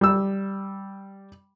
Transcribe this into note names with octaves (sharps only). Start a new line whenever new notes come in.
G3 E6